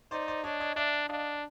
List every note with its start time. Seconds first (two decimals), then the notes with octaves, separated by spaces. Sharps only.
0.11 D#4 C5 D5
0.28 C5 D5
0.44 D4 C#5 D#5
0.60 C#5 D#5
0.76 D4 D5 E5
1.09 D4 D#5 F5